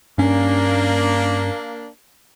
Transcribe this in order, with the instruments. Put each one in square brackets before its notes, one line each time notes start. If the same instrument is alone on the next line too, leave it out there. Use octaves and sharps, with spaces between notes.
[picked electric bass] G2 C#4 [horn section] A#3 D4